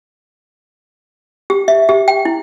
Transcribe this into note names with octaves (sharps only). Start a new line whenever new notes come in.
G4
E5
G4
G5
E4